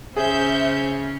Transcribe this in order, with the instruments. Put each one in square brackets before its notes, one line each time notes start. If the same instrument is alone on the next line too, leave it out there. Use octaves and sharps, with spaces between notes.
[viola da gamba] C#3 C#4 [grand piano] G#4 [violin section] C5 E5 G6